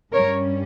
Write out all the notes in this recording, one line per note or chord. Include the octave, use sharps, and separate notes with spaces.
G2 G3 C#4 A#4 C#5